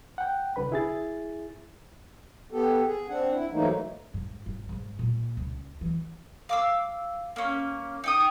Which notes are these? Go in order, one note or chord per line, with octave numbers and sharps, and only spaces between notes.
F#5 G5
C2 D3 B4 B5
E4 G#4 A6
B3 G4 A4
G#4
C4 D4 F#5
E4
G#2 E3 F#3 A3 A#3 D#4
G#2
G#1
G#2
A#2
C#2
E3
F5 D6 E6
A#3 C#4
D#4 G5 D#6